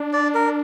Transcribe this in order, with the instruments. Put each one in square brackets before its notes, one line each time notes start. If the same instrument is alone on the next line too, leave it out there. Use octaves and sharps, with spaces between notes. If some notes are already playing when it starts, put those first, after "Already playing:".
Already playing: [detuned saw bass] D4
[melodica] D5
A#4